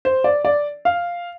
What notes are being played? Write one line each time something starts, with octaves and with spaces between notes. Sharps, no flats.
C5
D5
D5
F5